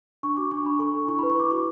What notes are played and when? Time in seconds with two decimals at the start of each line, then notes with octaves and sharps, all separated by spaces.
0.23 D4 C#6
0.37 F#4 D6
0.51 D4 C#6
0.65 D4 B5
0.79 A4 C#6
0.94 D4
1.08 E4 C#6
1.19 B5
1.23 B4
1.30 C#6
1.36 E4 D6
1.51 F#4 C#6